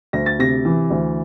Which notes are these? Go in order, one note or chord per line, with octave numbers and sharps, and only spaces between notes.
D2 A#6
A6
C3 A#6
E3
D2